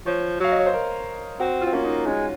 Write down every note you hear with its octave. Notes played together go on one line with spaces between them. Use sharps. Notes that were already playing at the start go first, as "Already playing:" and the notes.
F3 C#5
F#3 F5
D#5
C#5
C5
A#4
C4 F#4
C4 F4
A#3 C#4
D#4
G#3 C#4